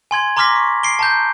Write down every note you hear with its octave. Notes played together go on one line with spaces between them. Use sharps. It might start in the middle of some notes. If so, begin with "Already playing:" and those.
G#5 C6 G#6 F#7
A#5 C6 D6 F6 A#6 B6
C#6
C7 D7 G7
A5 A#5 G6